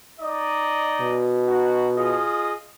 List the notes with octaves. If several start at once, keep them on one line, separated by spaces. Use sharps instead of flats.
D#4 D5 D#5
B2
D#4 F#4
F4 G#4 D#5